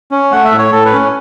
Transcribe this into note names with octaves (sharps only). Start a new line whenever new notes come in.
C#4
A3 F#5
E5
A2
C#5
A2 A4
B4
C#4